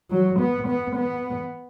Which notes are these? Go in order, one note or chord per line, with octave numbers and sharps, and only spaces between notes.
F#3
B3
B3
B3